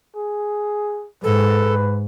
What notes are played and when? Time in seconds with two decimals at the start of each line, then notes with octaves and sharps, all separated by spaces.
0.16 G#4
1.24 G#2 A4 B4